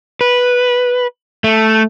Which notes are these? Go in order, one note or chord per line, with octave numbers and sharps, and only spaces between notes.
B4
A3